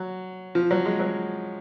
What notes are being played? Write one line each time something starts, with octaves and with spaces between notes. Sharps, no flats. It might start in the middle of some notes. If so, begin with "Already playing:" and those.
Already playing: F#3
F3
F#3
G#3
F#3